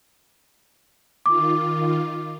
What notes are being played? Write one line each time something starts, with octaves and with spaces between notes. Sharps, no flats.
D#3 F4 D6